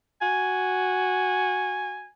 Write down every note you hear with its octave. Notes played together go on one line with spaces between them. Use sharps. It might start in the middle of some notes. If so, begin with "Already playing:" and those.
F#4 G#5